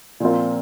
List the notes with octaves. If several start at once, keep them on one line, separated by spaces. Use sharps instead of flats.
A#2 F3 C4 F4 A#4